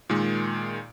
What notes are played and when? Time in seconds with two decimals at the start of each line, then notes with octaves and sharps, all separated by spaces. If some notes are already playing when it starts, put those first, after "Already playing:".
0.09 A#2 D#3 G#3